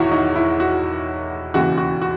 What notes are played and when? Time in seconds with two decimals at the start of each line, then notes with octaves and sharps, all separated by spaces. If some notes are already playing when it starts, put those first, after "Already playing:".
Already playing: E1 E2 D#3 E4 F#4 C#5
0.12 D#4
0.36 E4
0.60 F#4
1.54 E1 D#2 C#3 E3 F#4
1.77 F#4
2.02 F#4